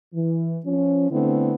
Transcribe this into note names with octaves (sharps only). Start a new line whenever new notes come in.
E3
F3 C#4
D3 A3 B3 C4 D4 E4